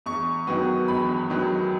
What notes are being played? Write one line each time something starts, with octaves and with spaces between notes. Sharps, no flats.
E2 C#6
D#3 F#3 B3
E2 B5
D#3 F#3 B3